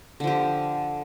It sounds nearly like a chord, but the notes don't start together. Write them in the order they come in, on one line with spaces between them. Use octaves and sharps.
D3 F3 G4